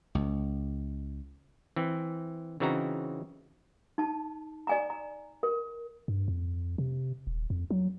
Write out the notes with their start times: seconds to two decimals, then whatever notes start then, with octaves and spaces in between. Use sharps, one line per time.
0.15 C#2
1.76 E3 C4
2.60 C#3 E3 C4 D#4 F#4 A#5
3.98 D#4 A5
4.67 D5 G#5 A#5
4.90 A#5
5.43 A#4
6.08 G2
6.28 F2
6.78 C3
7.27 D#1
7.50 F2
7.71 F#3